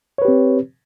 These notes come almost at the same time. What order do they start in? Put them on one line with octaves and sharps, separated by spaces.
C#5 B4 G4 C4